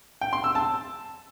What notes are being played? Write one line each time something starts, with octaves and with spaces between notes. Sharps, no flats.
G5
C6
E6
A5